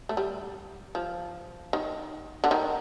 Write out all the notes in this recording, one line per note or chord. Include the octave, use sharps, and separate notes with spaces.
A3
G3
F3
D#3
D3
D#3